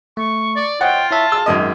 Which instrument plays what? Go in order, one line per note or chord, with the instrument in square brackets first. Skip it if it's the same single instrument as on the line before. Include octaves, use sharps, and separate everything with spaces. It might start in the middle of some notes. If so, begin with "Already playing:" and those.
[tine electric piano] A3 [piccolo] C#6
[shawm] D5
[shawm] F4 [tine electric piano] C5 C#5 D#5 [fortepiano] F#5 [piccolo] G5
[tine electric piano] E4 C#5 E5 [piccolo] A5
[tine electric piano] G#4 [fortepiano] E6
[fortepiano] G#1 F#2 D#5